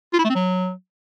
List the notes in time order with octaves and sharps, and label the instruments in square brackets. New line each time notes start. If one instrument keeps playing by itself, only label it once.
[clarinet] F4
E4
A3
C4
F#3